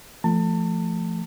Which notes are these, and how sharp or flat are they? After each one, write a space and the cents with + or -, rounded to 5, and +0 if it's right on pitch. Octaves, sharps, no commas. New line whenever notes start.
F3 -25 A3 +0 A5 +30